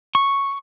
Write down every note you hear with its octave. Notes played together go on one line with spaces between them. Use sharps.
C#6